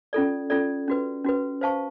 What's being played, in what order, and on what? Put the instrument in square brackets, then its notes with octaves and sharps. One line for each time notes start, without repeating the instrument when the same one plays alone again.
[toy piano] C#4 F4 A4 D5
C#4 F4 A4 D5
C#4 F#4 B4
C#4 F#4 B4
C5 F5 A5 C#6